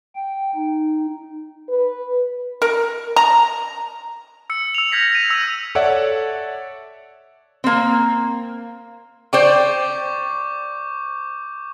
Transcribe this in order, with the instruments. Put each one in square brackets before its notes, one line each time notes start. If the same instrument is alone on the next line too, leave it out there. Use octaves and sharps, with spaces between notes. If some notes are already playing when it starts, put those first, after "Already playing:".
[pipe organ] G5
D#4
[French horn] B4
[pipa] A#4
A#5
[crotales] E6 C#7
E6 F7
F6 G6 G#6 A#6 B6 C#7
D#7
E6 F7
[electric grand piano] A4 C#5 D5 E5 F#5
[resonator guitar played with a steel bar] A#3 C4
[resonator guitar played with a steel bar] C5 D5 G5 [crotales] C#6 D6 G6